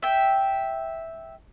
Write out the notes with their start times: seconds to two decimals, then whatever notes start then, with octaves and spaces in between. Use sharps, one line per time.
0.02 E5 G5